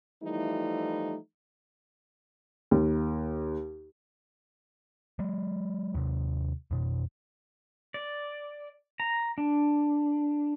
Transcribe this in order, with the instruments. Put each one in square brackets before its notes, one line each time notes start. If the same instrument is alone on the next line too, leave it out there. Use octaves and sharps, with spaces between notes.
[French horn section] E3 F3 G3 A3 D#4 E4
[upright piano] D#2
[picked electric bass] F#3 G#3
D#2 C3
F2 B2
[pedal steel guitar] D5
A#5
D4